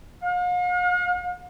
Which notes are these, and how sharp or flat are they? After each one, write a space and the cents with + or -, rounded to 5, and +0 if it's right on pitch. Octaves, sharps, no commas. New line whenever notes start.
F5 +45